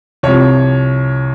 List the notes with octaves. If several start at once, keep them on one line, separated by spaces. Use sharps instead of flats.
C2 C3 F3 C#5